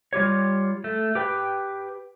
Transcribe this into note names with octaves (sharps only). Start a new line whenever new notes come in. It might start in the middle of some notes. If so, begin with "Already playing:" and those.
G3 F4 G4 C#5
A3
G4 B4 G5